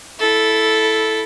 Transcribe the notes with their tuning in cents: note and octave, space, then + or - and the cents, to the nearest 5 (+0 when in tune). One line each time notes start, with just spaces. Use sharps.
E4 +0 A4 -5